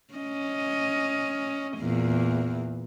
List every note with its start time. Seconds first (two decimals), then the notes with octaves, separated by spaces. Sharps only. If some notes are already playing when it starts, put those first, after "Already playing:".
0.14 C#4 D#5
1.78 E2 A#2